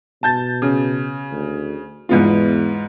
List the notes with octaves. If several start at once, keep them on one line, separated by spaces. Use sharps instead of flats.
B2 A5 G6 A6
C#3
D2
E2 G#2 B3 F4